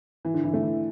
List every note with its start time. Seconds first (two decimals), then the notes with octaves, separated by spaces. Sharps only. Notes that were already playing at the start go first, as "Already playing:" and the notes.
0.25 E3
0.34 D3
0.44 E3
0.54 A3
0.63 E3